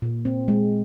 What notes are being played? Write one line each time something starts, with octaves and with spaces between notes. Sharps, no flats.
A#2
C4
G#3